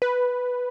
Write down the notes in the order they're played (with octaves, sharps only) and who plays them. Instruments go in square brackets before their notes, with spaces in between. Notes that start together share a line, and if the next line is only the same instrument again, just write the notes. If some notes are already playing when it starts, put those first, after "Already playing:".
[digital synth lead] B4